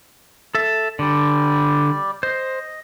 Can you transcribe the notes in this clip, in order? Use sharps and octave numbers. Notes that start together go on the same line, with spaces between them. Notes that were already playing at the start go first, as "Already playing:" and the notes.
A4 E5
D3 G3 D5
C5 D#5